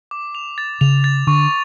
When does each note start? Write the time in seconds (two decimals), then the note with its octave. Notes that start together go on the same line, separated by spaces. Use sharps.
0.11 D6
0.35 F7
0.58 A6
0.81 C#3 F7
1.04 A6
1.27 D3 C#6